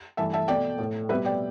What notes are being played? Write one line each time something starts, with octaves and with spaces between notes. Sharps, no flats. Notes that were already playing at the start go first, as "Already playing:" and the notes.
G2 E3 A3 E5 A5
E5 A5
B2 A3 D5 G5
A2 A3
B2 G3 B4 E5
D5 G5